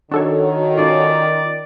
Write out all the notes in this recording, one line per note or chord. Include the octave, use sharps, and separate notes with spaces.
D#3 D4 F#4 A4 C#5
C#4 D#4 F4 D5